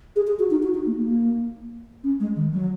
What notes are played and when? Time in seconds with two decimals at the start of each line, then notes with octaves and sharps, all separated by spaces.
0.16 G#4
0.27 G#4
0.39 F#4
0.51 D#4
0.62 F#4
0.74 D#4
0.86 A#3
0.98 A#3
2.04 C#4
2.20 G#3
2.36 D#3
2.52 F#3